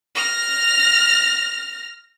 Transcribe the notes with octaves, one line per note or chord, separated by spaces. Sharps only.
F6 A#6